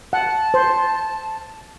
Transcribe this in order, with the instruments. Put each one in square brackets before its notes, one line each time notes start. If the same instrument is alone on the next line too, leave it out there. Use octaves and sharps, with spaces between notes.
[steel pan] F#5 [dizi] A5
[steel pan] C5